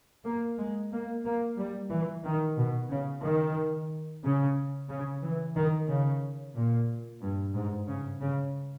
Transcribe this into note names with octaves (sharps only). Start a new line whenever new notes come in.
A#3
G#3
A#3
A#3
G3
E3
D#3
B2
C#3
D#3
C#3
C#3
E3
D#3
C#3
A#2
G2
G#2
C#3
C#3